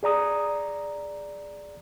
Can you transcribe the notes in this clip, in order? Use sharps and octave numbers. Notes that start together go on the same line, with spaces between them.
G#4 D5 A#5 D#6